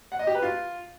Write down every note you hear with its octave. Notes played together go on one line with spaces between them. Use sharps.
F#5
D#5
G4
B4
F4